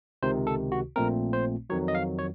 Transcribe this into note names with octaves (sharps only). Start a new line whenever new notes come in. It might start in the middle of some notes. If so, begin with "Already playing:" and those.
C#2 C3 D#3 C5
A4
F#4
A#1 A#2 A3 C4 A#4
C5
F2 D#3 F#3 C#5
D#5
F5
C#5